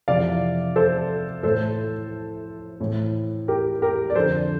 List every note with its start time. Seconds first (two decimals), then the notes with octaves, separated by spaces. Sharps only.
0.08 F2 C3 E3 D5 F5
0.76 A4 C5
1.43 A2 E3 A4 C5
2.80 A2 E3
3.48 G4 A#4
3.82 G4 A#4
4.10 D5
4.15 F2 D3 A4 C5